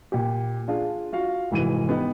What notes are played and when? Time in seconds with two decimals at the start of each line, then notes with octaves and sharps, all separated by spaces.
0.12 A#2 G4
0.68 D4 F4 G#4
1.12 F4 F#4 F5
1.51 F1 G#2 E3 F#4 D#7
1.89 B3 D#4 G4 B4